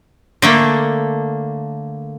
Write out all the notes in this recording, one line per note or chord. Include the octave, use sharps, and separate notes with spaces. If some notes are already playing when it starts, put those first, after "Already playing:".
D3 A3 A#3